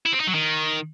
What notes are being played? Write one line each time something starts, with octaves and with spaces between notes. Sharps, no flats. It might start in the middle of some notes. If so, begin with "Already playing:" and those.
E4
C4
D#4
F#3
D#3